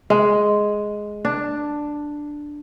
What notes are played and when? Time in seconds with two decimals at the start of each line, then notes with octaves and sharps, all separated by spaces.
0.10 G#3
1.25 D4